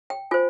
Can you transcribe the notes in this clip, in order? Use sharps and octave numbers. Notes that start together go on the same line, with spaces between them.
G5
F4 C5 G#5